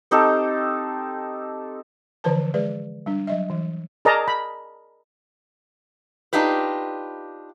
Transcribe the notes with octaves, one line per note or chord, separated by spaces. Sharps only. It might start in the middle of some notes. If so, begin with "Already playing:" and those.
C4 D#4 G4 A4
D3 E3 F3 B4 C5 A5
G#3 G#4 B4 D5
G3 D4
F#3 D#5 E5
E3
G#4 A#4 D5 D#5 A5 A#5
B5
D4 D#4 F4 G4 B4